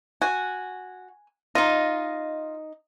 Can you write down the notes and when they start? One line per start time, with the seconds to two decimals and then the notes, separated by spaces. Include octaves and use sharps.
0.22 F#4 G#5
1.55 D#4 F4 D#5